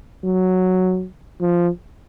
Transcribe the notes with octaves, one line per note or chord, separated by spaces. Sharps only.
F#3
F3